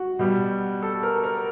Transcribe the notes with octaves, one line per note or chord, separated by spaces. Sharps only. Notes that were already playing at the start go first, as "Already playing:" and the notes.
Already playing: F#4
B2 G3
A4
A#4
A#4